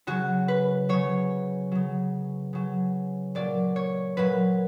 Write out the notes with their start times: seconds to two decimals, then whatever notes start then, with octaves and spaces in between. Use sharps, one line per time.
0.07 C#3 F#3 F#4
0.48 B4
0.89 C#3 F#3 C#5
1.72 C#3 F#3
2.53 C#3 F#3
3.35 A#2 F#3 D5
3.76 C#5
4.17 A#2 F#3 B4